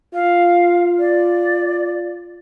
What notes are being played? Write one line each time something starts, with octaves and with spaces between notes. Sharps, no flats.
F4 F5
D5